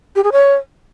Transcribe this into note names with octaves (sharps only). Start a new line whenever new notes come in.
G4
G#4
C#5